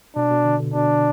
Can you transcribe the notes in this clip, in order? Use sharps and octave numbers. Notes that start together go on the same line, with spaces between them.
B2 D4
B2
D3
D3
B2 D4